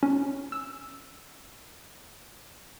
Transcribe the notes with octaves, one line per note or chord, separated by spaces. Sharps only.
C#4
E6